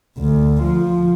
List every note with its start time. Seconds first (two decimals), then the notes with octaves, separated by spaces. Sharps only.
0.18 D2
0.62 F3